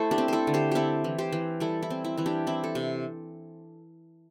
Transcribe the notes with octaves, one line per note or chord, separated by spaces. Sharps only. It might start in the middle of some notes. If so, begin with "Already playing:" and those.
Already playing: A3 E4 A4 C5
D4 G4
C4
E4 A4 C5
D3
G4 C5
C4 E4 G4 A4
E3
G4 C5
E3
G3 E4 A4
E4
C4
E4
E3 E4
D4 G4
C4 E4
A4
C3